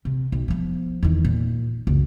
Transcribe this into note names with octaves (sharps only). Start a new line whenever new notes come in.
C3
B1
F3 B3
E2 D#3
A#2
F#1 C#2